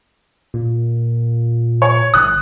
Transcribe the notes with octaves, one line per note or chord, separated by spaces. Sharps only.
A#2
C#5
G1 D#6 F#6